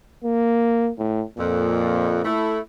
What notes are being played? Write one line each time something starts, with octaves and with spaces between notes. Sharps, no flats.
A#3
A2
F2 A#2
A3 E4